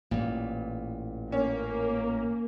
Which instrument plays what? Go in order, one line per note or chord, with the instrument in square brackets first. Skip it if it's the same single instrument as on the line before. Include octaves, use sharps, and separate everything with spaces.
[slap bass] A1 E3 [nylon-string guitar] A#2
[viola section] A#3 [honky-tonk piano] C#4